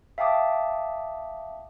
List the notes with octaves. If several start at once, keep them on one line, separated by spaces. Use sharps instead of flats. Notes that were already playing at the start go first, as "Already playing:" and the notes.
E5 F5 G5 A5 D6 D#6